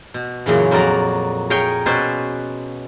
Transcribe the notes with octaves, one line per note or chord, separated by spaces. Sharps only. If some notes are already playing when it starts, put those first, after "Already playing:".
B2
F#2 A#2 C#3 E3
F2 F#3 A#4 D5 A#5
G#4 A#4 C#5 G5 G#5
B2 C#4 B4 C5 D5 G#5